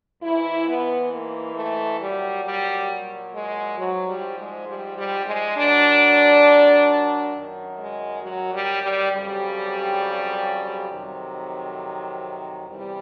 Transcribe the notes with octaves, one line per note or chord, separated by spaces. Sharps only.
G#2 E3 E4
B3
A#3
A3
A#2 F#3 G3
G3
G#3
G#2 F3 F#3
G3
G#3
G3
G3
G#3
A#2 F#3 D4
F#2 D#3 F#3
G#3
F#3
G3
G3
F2 C#3 F#3 G3
F2 C3 D#3 F#3
E2 C3 E3 G3